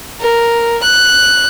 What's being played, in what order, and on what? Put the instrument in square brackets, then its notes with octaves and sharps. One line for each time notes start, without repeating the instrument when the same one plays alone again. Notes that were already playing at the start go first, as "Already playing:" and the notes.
[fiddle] A#4
F#6